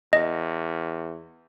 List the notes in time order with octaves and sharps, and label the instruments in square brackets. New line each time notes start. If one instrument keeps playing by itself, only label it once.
[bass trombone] E2 [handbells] D#5